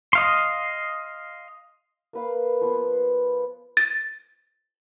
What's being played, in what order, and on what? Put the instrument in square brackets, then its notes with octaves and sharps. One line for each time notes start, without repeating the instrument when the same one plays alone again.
[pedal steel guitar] D#5 F5 C6
[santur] A#3 B4 F5
F3 B3
[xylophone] A6